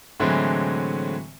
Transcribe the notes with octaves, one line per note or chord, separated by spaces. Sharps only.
A2 D3 E3 F#3 G#3 C4